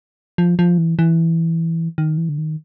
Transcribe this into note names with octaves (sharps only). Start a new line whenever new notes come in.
F3
F3
E3
E3
D#3
E3
D3
D#3